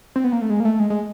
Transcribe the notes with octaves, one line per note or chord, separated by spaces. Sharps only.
C4
B3
A#3
A3
G#3
A#3
A3
G#3
G#3